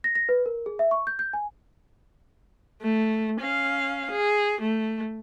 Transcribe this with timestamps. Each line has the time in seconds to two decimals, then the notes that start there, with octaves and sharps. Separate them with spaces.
0.04 A#6
0.15 A#6
0.29 B4
0.46 A#4
0.66 G#4
0.79 E5
0.91 C#6
1.07 G6
1.19 G6
1.33 G#5
2.82 A3
3.40 C#4 F5
4.11 G#4
4.61 A3